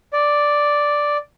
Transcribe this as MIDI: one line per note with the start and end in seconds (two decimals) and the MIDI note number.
0.13 1.17 74